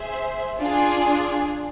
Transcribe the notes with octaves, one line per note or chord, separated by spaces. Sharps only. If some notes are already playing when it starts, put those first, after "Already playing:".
Already playing: G#4 C5 E5
D4 F4 G#4